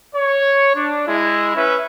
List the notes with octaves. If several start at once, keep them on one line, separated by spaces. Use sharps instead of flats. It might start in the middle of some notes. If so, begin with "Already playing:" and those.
C#5
D4
G#3 E4
C#4 B4 E5